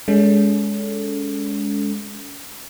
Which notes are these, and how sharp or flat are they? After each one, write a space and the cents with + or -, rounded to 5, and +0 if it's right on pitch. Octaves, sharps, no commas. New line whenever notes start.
G#3 +0 C#4 +35 A4 +0